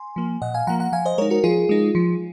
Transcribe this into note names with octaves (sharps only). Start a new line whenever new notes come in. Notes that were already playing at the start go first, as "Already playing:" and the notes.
Already playing: G#5 C6
F3 A#3
A#2 D#5 F#5
F5 G#5
F3 A#3 F#5 A#5
F#5 A#5
F3 F5 G#5
C5 D#5
G#3 D#4 A#4 C#5
F#4 A#4
F3 F4 G#4
G#3 D#4
F3